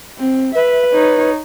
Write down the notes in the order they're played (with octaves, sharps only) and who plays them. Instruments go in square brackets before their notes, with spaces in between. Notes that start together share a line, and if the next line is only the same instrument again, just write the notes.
[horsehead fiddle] C4
[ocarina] B4 [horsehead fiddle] E5
[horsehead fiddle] D#4 C#5